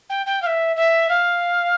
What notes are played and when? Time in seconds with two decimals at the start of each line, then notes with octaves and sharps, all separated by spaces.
0.10 G5
0.26 G5
0.42 F5
0.46 E5
0.76 E5
1.09 F5